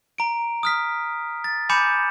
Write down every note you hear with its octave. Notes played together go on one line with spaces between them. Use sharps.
A#5 D7
D#6 F6 B6
A6
G#5 B5 D6 G6 C#7 E7